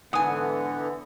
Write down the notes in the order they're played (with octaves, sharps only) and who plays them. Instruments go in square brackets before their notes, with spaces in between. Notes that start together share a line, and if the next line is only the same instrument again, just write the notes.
[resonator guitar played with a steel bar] G#2 G#5 [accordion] D3 E3 B3 [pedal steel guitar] F#5 D#6